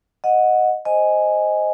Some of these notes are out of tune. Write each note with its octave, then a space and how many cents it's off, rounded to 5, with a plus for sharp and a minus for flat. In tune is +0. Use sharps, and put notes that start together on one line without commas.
D#5 +0 F#5 -15
C5 +0 D#5 +0 G#5 +0